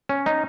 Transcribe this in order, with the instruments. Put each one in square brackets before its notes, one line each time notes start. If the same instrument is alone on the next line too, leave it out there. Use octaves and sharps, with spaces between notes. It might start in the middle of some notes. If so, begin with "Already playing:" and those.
[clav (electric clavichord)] C#4
D#4